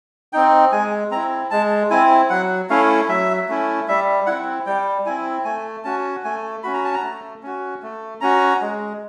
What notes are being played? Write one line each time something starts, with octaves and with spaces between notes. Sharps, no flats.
C4 D#4 G5
G#3 G#5
C4 E4 A#5
G#3 A5
C4 E4 G#5
F#3 F#5
A3 C#4 E4 F5
F#3 E5
A3 C#4 E4
G3 E5
C4 E4 F#5
G3 G5
C4 E4 G#5
A3 G#5
C#4 F#4 A5
A3 G#5
C#4 F#4 B5
A#5
A5
A#5
A3
C#4 F#4
A3
C#4 F#4 A#5
G#3